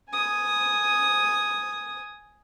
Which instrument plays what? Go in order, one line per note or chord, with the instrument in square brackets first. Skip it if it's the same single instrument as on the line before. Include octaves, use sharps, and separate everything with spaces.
[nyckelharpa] G#5 D#6